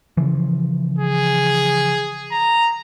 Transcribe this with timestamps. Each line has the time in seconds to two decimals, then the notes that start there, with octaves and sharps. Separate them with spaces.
0.17 C#3 E3 F3
0.99 G#4
2.32 A#5